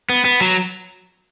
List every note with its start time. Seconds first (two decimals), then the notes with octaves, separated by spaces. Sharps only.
0.09 B3
0.25 B3
0.41 F#3